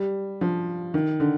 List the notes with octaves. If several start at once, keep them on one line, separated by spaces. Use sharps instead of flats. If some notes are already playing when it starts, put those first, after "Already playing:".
Already playing: G3
F3
D#3
D3